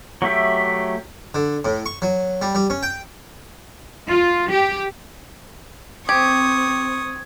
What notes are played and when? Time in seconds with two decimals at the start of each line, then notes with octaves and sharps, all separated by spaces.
0.22 F#3 A3 G4 E5
1.35 D3
1.65 A2
1.86 C#6
2.02 F#3
2.42 G3
2.55 G3
2.70 C#4
2.83 G5
4.10 F4
4.49 G4
6.09 C4 G4 C#6 D#6 G#6